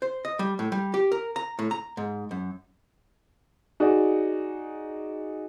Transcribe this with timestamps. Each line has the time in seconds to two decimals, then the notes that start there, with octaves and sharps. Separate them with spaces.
0.02 C5
0.25 D#5
0.39 G3
0.59 A2
0.72 G3
0.94 G4
1.12 A#4
1.36 A#5
1.59 A2
1.71 A#5
1.97 G#2
2.31 F#2
3.80 D#4 F#4 G#4 D5